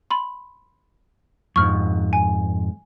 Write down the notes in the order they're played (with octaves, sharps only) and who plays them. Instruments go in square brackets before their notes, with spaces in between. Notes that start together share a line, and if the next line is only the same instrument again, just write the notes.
[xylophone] B5 C6
[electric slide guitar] F2 G#2 [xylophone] C#6 F6
[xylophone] G#5